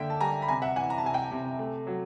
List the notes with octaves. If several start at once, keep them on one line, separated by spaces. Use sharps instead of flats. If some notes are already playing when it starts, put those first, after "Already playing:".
Already playing: D3 A#3 E5 G5
A5
G3 G#5 A#5
B5
C3 G#5 A#5
E5 F#5
E3 F#5 G#5
A#5
A5
C3 G#5
G5 A5
C3
A3
F#3